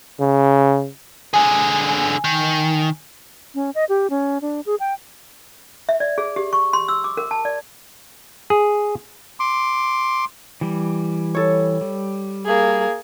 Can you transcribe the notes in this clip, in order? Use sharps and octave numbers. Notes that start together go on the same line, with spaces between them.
C#3
D3 G#4 G#5
D#3
C#4
D#5
G4
C#4
D4
G#4
G5
E5
D5
G#4
G4
C#6
C6
E6
D6
A#4
A5
D5
G#4
C6 D6
E3 G3
A4 C#5
G3
A#3 G#4